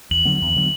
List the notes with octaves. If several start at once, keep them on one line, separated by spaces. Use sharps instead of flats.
E2 F#7
D3 F#3 B3
E2
D3 F#3 B3